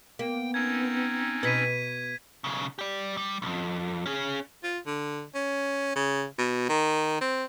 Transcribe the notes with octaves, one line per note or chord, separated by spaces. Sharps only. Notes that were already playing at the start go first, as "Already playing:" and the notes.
A#3 B3 G5
C4 C#4 D#4 G#6
B2 B4 G#6 B6 D#7
B1 C#3
G4 D5
G3
B1 F2
C#4 G#4
F4
D3
C#4
C#3
B2
D#3
C4